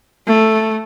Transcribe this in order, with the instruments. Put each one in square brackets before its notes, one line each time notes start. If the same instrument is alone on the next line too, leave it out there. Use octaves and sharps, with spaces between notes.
[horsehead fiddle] A3